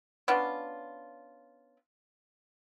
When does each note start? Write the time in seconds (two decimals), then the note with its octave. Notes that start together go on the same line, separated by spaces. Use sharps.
0.28 B3 C#4 D4 F4